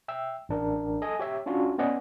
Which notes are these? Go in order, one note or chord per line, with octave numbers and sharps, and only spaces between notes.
E5 G5 E6
A1 D4 A#4
A4 D#5 G#5
G4 C#5 E5
C#4 D4 F4 F#4
B3 C#4 D5 D#5 F#5